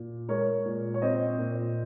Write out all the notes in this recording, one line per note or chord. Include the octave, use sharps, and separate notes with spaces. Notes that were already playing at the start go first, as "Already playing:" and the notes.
Already playing: A#2
G#3 A#4 C#5
A#2
C#5
C4 C5 D#5
A#2